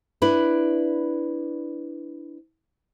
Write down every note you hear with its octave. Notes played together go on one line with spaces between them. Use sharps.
D4 E4 B4